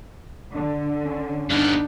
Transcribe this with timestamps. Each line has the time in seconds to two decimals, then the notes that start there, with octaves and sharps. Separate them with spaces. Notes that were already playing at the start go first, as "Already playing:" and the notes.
0.54 D3 D4
1.05 C#4
1.50 G2 B3 D4 D#4